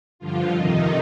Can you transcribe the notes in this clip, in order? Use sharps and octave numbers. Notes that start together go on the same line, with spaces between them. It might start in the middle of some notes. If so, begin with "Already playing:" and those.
G2 D3 F3 F4
F2 C3 D#3 D#4